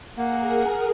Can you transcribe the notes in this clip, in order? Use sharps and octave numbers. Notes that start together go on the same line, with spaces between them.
A#3 G#4 A#4 F#5